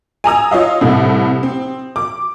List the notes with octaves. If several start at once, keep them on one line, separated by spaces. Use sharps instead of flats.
G#5 A#5 D#6 E6
F4 C#5 D#5 F5
C2 A2
C4
D6